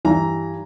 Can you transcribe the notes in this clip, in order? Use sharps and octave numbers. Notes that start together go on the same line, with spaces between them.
G2 E3 G3 A#5